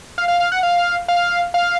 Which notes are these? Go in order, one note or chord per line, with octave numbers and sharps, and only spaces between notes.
F5
F5
F5
F#5
F5
F5
F5